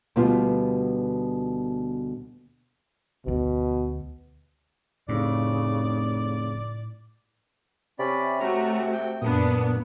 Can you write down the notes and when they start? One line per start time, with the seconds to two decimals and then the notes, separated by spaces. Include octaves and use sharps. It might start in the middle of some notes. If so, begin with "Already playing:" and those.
0.16 D2 B2 G3 B3 F4
3.26 D2 B2 D#4
5.09 F1 A2 C#3 D5
7.99 C3 C#4 D5 B5
8.40 A3 C#4 F#4 A#5
8.93 G5
9.22 F#2 A#2 B3 D4 D#6